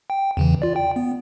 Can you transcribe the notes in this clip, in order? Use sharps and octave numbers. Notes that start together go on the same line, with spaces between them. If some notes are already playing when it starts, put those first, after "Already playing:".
G5
E2 C#3 E3
F4 D5
G5
B3